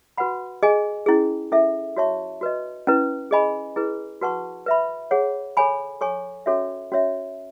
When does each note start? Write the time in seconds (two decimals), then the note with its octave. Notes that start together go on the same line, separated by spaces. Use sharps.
0.18 F#4 B4 F#5 B5
0.63 G#4 D#5 G#5
1.06 C#4 E4 G#4
1.52 C#4 E4 A4 E5
1.97 F#4 C#5 E5 A5 C#6
2.41 F#4 B4 D#5
2.87 C#4 E4 B4
3.31 G#4 D#5 G#5 B5
3.76 E4 G#4 B4
4.21 F#4 B4 F#5 A5 C#6
4.66 B4 E5 B5
5.11 G#4 C#5 F#5
5.57 A4 C#5 G#5 B5
6.01 A4 C#5 G#5 C#6
6.46 C#4 F#4 A4 C#5 E5
6.92 C#4 F#4 C#5 E5